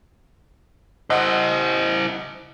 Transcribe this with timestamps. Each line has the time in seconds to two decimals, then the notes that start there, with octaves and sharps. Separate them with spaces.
1.10 E4 C5 D#5 F#5 E6